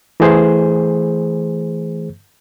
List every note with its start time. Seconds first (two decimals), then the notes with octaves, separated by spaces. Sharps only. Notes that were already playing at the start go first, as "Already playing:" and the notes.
0.20 E3 A3 G#4 C5